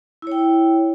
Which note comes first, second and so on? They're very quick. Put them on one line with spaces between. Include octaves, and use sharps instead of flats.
E4 C#5 G5